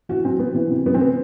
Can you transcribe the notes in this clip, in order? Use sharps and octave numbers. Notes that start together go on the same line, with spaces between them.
E3 F#4
F#3 C4
F#3 B3
E3
C3
F#2 B3
C4
B3